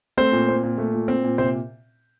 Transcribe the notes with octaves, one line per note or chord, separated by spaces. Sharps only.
A3 C4 C5
A#2
C4
A#2
A3
A#2
C4
A#2
C3 C4 C5